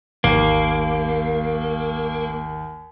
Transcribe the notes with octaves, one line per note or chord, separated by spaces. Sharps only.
G#1 D#2 A#3